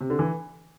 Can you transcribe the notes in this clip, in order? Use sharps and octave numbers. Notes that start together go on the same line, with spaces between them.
C3
D3
E3